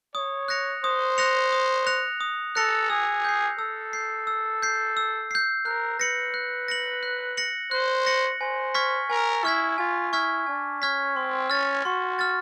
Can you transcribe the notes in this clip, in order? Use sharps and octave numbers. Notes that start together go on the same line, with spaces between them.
C#5 D#6
F#6 A#6 C#7 F7
C5 D#6
F#6 A#6 C#7 F7
D#6
F#6 A#6 C#7 F7
D#6
A4 F#6 A#6 C#7 F7
G#4 E6
G6 C7
A4 E6
G6 C7
E6
G6 C7
E6
G6 C7
A#4 F#6
B4 A#6 C#7 F#7
F#6
A#6 C#7 F#7
F#6
A#6 C#7 F#7
C5 F#6
A#6 C#7 F#7
C5 G#5
C#6 F6 G#6 B6
A#4 G#5
E4 C#6 F6 G#6 B6
F4 G#5
E4 C#6 F6 G#6 B6
D4 G#5
C#4 C#6 F6 G#6 B6
C4 C6
C#4 F6 A6
F#4 C6
F6 A6